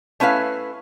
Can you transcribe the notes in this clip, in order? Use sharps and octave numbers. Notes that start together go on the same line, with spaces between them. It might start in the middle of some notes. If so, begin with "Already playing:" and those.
A3 C#4 E4 B4 F5